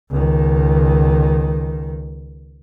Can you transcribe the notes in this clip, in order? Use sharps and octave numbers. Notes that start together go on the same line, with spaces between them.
C#2 D#3